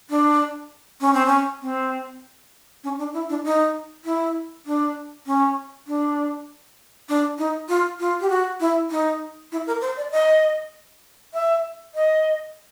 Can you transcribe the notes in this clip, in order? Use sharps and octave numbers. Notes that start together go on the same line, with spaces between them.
D4
C#4
C4
C#4
C4
C#4
D4
E4
D4
D#4
E4
D4
C#4
D4
D4
D#4
F4
F4
G4
F#4
E4
D#4
E4
A#4
C5
D5
D#5
E5
D#5